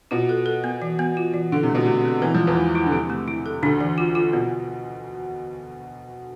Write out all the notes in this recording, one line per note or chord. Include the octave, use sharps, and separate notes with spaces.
B2 F4
A4
A4
B3
E3
B3
F4
E3
D3 E4
C3
A3
B2
C3 A3
A3
E3 B3
F3
G#3
E2 E3
G#3
E4
D3
C3 E4
A3
E4
A4
D2 D3 D4
E3
F4
F4
B2 B3